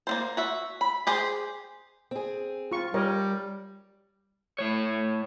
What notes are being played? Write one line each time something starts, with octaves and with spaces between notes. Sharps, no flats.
A#3 C4 C5
F#4 E5
B5
G4 G#4 C5
C4 G#4
F4 C#6
G3 G4 A#4 C#5 D#5
A2 C#5